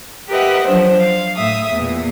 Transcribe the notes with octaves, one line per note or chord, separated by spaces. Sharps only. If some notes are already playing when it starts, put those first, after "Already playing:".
G4 A#4 B4 D#5 E5 F#5
F3 F#3 D4 C5
F5
A2 E5 D#6
E2 A#2